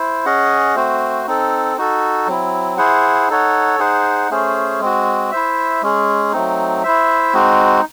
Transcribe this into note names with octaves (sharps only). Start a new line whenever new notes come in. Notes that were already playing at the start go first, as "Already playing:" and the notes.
Already playing: E4 C5
C#4 G#4 D#5 F#5
A3 C4 F#4 C5
C4 D#4 A4
D#4 F#4 A4
F#3 C4 E4
E4 G#4 C5 F#5
D#4 A4 C#5 F#5
D#4 G#4 C5 F#5
A3 C#4 G#4 C5
G#3 C4 F#4
E4 C5 E5
G#3 C#4 G#4
F#3 A3 C4 D#4
E4 C5 E5
G#3 C4 D#4 F#4